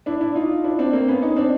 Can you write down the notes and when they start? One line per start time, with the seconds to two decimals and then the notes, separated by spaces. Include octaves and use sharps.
0.06 D4 E4
0.21 D4 E4
0.35 D#4 F4
0.64 D4 E4
0.79 C4 D4
0.93 A#3 C4
1.08 B3 C#4
1.22 C#4 D#4
1.37 C4 D4